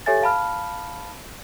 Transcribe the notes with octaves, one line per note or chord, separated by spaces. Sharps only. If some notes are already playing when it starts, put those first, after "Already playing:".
G4 A4 C#5 E5 G#5 A6
F5 A5 B5 F6